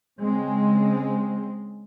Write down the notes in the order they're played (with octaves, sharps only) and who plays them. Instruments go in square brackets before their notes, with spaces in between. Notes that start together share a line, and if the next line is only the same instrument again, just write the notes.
[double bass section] C#3 G#3 C4